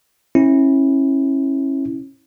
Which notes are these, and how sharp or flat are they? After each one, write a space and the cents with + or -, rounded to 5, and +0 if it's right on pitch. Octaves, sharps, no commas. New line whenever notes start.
C#4 -30 E4 -15